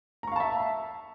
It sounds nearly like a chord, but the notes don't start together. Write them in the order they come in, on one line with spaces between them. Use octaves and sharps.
A#5 C#6 F5 A5 E5